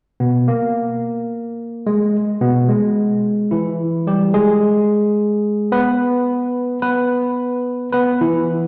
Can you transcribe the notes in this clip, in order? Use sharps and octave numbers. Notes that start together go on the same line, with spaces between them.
B2 B3
A#3
G#3
B2 B3
G#3
E3 E4
G3 G4
G#3 G#4
B3 B4
B3 B4
B3 B4
E3 E4